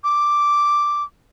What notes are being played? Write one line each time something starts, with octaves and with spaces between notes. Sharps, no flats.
D6